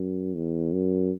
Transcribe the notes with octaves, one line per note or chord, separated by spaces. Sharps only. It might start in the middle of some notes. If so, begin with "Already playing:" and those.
Already playing: F#2
E2
F#2